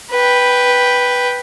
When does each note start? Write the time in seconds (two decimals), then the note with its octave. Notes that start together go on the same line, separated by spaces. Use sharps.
0.12 B4 G5